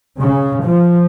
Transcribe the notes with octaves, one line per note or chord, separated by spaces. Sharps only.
C#3
F3